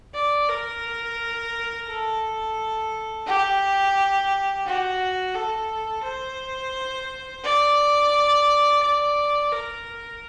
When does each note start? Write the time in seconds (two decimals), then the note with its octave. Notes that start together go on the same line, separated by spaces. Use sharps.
0.14 D5
0.49 A#4
1.88 A4
3.27 G4
4.66 F#4
5.35 A4
6.04 C5
7.44 D5
8.82 D5
9.52 A#4